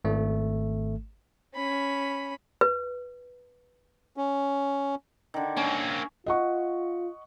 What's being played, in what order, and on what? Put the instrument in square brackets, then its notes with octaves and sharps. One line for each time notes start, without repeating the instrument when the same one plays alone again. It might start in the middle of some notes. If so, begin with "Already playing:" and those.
[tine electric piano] G#1 A3
[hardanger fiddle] C#4 B5
[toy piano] B4
[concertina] C#4
[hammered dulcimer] D3 D#3
[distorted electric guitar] A#3 C4 [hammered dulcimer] C#4
[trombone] F4 [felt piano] D#5 F#5 C#6